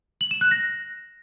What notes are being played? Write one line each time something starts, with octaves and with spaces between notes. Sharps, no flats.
F#7
E7
F#6
A#6